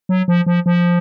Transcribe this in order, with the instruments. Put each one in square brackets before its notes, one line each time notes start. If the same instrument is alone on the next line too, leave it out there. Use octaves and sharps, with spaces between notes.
[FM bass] F#3
F3
F3
F3